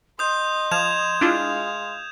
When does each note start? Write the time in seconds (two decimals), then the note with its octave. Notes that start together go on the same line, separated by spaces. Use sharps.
0.19 D#5 C6 D#6 G6
0.71 F3 G#6 E7 F7
1.21 G#3 D4 E4 F4 F5